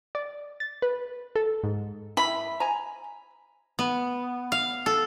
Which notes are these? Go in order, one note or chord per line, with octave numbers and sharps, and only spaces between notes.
D5
A6
B4
A4
G#2
E4 B5
G#5 A#5
B3
F5
A4